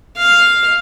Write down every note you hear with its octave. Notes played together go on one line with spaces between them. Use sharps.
F5